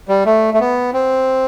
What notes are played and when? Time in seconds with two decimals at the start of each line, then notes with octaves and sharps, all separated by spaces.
0.09 G3
0.26 A3
0.54 A3
0.60 B3
0.93 C4